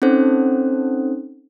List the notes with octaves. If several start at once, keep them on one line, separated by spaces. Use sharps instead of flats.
C4 C#4 D#4 A4 C5